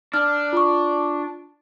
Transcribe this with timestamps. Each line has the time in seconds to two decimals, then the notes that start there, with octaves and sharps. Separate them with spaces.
0.14 D4 F6
0.53 F4 C#6